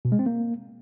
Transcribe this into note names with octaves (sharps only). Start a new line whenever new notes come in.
B2
G#3
C4
A#3